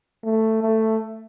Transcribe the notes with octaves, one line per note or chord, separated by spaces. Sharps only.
A3
A3